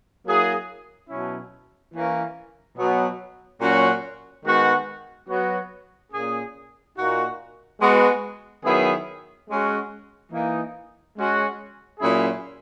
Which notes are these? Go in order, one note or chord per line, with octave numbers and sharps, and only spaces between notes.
F#3 A#3 E4 G#4
B2 F#3 C#4 E4
E3 A#3 C#4
B2 F#3 B3
A#2 F#3 C#4 F#4
D#3 G#3 B3 F#4
F#3 B3 F#4
A#2 A#3 C#4 G#4
A#2 A#3 D#4 F#4
G#3 B3 F#4
D#3 F#3 B3 E4 G#4
G#3 C#4 F#4
E3 A#3 D#4
G#3 C#4 F#4
A#2 F#3 C#4 E4 G#4